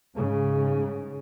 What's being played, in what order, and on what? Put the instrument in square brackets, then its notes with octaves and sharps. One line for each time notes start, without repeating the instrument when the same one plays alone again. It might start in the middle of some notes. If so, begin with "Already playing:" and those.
[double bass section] G#2 C#3